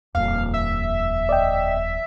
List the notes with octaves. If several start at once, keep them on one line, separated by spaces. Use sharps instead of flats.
D#1 F2 F5
E5
D5 D#5 G5